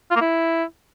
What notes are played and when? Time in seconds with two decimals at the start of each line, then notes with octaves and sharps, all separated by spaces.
0.11 F4
0.16 A#3
0.21 E4